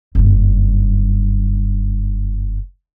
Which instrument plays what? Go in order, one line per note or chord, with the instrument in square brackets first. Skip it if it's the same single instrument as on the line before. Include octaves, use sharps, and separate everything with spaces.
[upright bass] F#1 G2